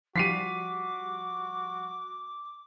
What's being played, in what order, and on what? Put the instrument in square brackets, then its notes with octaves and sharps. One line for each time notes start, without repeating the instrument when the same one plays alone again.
[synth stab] F3 G3 [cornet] F#4 [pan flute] D6 [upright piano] B6 C7 D#7